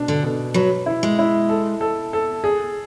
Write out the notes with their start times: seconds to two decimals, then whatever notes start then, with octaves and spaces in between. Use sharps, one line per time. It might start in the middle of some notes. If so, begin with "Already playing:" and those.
Already playing: B2 D4
0.08 D3
0.23 B2
0.54 F#3 B4
0.86 E4
1.03 G#3
1.19 E4
1.49 A4
1.81 A4
2.13 A4
2.44 G#4